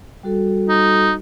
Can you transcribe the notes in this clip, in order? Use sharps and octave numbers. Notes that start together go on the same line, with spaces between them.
G3 F#4 A4
D#4